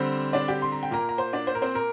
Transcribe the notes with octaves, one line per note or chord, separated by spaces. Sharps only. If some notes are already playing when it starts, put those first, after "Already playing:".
Already playing: D3 G3 C4 C5
D4 D5
G4 G5
C6
A#5
G5
A#2 A#3 A#4 A#5
A#5
C5 C6
D4 D5
C5
A#4
C4 C5
A#4